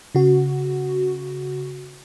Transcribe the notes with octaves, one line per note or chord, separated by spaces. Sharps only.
C#3 F#4